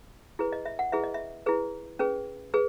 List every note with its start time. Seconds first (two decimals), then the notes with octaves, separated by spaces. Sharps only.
0.39 E4 G#4 B4
0.53 D#5
0.66 E5
0.79 F#5
0.92 E4 G#4 B4 E5
1.04 D#5
1.14 E5
1.46 E4 G#4 B4
1.99 C#4 G#4 B4
2.54 G#4 B4